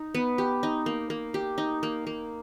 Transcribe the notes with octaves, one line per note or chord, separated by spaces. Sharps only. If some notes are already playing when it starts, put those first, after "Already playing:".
Already playing: D#4
B3
G4
D#4
A#3
A#3
G4
D#4
A#3
A#3